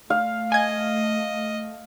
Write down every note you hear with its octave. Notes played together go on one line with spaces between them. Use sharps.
A3 F5
D#5 G#5 G#6